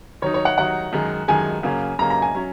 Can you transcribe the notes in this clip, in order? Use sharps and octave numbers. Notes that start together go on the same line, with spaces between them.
D#3 F#3 D#4 C#5
C#5
F#5
D#3 F#3 D#4 F#5
F#2 D#3 G#3
F#2 D#3 G#3 G#5
F#2 C#3 A#3 C#4
F#2 C#3 A#3 C#4 A#5
A#5
G#5
F#3 C#4